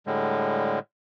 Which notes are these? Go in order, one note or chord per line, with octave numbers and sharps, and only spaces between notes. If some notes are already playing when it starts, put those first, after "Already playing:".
A2 D3 G3 G#3